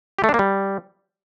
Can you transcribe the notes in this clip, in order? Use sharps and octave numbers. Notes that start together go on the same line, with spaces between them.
G4
A3
D4
A#3
G3